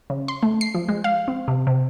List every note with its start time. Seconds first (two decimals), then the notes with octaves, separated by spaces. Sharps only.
0.10 C#3
0.28 C6
0.43 A3
0.61 C7
0.75 F3
0.89 G#3
1.04 F5
1.28 C4
1.48 C3
1.67 C3